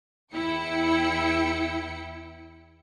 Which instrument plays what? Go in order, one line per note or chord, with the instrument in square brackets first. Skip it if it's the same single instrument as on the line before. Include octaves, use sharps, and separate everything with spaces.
[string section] E2 E4 G5 C#7